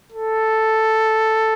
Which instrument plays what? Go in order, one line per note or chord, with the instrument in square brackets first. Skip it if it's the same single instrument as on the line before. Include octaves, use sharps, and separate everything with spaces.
[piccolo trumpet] A4